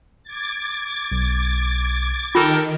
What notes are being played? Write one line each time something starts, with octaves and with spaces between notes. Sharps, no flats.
D6 G#6 A6
B1
D#3 F4 G4 A4 A#4